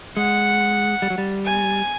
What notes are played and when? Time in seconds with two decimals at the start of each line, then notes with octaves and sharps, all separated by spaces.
0.17 G#3 F#5
1.02 G3
1.10 F#3
1.18 G3
1.46 G#5